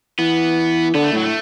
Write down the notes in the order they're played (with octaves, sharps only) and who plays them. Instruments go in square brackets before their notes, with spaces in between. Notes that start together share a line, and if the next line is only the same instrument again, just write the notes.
[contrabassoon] E3 [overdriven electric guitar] B3
[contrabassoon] D3 [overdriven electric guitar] B3
[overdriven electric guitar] A3
[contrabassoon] A2 [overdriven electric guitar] F#3
[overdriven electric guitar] A3